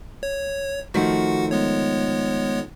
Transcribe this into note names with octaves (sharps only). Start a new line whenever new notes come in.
C#5
D#3 F3 A3 F#4 F#5
G#3 B3 C#5